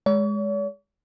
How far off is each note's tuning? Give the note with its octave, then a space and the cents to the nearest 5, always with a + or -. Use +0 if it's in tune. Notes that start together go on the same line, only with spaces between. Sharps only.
G#3 +0 C#5 +45